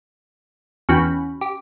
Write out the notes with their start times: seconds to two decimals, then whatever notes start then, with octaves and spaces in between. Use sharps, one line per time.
0.89 E2 E3 C#4 F#4 G5 B5
1.41 G4